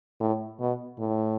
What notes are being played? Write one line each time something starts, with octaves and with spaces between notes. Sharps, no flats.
A2
B2
A2